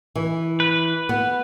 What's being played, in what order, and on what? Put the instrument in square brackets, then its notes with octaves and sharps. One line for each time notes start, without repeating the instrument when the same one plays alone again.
[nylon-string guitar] E3
[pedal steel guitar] B4
[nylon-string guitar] B3